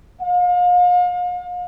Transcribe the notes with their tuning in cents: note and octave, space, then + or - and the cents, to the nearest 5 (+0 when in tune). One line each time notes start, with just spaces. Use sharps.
F5 +40